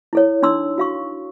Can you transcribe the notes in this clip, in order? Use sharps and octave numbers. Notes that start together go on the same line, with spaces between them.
E4 A4 C#5
D4 D#4 C6 E6
F#4 F5 C#6